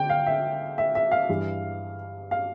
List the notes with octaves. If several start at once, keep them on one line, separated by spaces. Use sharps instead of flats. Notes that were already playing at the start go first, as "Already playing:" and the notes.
Already playing: D3 G5
F5
E5
E5
E5
F5
G2 E3
F5